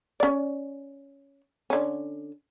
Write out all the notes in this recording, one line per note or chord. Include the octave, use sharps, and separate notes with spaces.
C#4 D5
D3 C#4